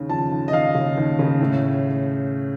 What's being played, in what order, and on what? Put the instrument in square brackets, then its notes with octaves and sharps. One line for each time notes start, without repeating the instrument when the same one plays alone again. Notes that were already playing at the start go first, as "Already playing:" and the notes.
Already playing: [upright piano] D#2 C#3
F3 A5
D#2
D#5
D#2 F5
C#3
D#2
C#3
A2